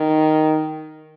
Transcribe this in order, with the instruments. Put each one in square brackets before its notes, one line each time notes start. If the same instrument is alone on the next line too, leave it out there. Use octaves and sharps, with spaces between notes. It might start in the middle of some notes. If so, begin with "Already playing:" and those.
Already playing: [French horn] D#3